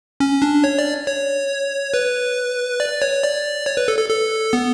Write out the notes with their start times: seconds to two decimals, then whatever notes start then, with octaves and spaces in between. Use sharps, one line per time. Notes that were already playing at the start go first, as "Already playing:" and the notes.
0.20 C#4
0.42 D4
0.64 C#5
0.79 D5
1.07 C#5
1.94 B4
2.80 D5
3.02 C#5
3.24 D5
3.66 C#5
3.77 B4
3.88 A4
3.98 A4
4.10 A4
4.53 B3